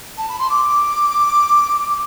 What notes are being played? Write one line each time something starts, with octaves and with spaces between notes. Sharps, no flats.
A5
B5
C6
D6